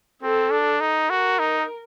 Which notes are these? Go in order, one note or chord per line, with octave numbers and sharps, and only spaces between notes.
C4 A4
D4
D#4
F#4 A#4
D#4